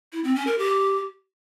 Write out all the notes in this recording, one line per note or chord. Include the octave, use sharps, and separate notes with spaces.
E4
C4
C#4
A#4
G4